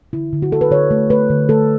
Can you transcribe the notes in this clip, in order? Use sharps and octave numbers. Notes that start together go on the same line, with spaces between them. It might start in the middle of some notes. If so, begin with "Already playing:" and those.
D3 E4
D3
F#4
D3 A4
B4
D3 C#5
A3
A3 B4
D3
A3 A4